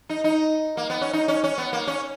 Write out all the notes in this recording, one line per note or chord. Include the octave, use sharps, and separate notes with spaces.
D#4
D#4
A#3
B3
C#4
D#4
C#4
C#4
B3
A#3
C#4